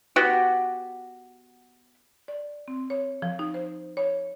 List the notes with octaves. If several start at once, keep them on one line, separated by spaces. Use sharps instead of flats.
B3 F#4 G4
D5
C4
C#5
F3
D#4
C5
C#5